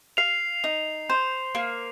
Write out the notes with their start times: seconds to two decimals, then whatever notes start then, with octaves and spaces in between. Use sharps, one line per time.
0.17 F5 C7 F7
0.64 D#4
1.09 C5
1.55 A#3